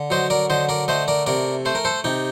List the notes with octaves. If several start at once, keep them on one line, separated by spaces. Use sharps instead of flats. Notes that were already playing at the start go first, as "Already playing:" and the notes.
Already playing: D3
F#3 C5 D#5
A#4 D5
D3 C5 D#5
A#4 D5
A3 C5 D#5
A#4 D5
C3 A#4 D5
A3 C5
A#4
A4 C5
C3 D#4 G4